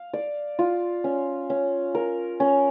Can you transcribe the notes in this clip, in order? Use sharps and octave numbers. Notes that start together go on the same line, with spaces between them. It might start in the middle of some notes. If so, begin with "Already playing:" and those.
Already playing: F5
D5
F4
C#4
C#4
A#4
C#4